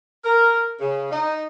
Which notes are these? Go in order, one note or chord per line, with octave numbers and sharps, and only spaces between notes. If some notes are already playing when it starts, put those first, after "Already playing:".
A#4
C#3
D#4